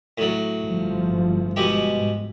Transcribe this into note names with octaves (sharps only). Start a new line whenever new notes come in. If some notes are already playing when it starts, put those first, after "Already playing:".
A2 F#3
G1 F3
B2 G#3 G4
G#2